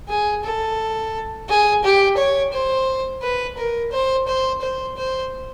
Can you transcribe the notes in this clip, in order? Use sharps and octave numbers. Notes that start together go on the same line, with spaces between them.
G#4
A4
G#4
G4
C#5
C5
B4
A#4
C5
C5
C5
C5